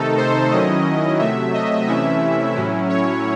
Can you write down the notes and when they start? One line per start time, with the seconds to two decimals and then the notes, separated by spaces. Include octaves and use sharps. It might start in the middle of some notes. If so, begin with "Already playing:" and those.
Already playing: C3 D#3 A3 D#4 A4
0.17 C5
0.51 D#3 F#3 C#4 E4 D#5
1.19 C3 F#3 A3 E5
1.54 D#5
1.88 C3 E3 A3 C#4 E4 E5
2.56 A2 F#3 C#4 E4
2.89 C#5